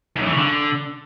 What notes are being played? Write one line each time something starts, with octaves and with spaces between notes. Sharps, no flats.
G#2
F#2
E3
C#3
D3